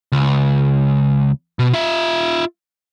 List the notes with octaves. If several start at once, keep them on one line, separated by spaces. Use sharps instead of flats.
C#2
B2
F4 E5